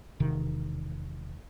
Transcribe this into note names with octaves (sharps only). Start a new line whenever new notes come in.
E1 C3 D#3